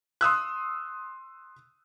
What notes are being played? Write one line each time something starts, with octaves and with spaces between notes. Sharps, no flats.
C6 D#6 E6 F#6